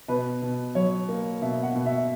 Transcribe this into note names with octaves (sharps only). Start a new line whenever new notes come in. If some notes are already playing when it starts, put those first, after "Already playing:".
B2 B4
B2
F#3 C#5
A#3
B2 E5
F#5
B2
E5